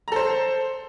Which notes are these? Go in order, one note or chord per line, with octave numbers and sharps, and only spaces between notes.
A4 C5 A#5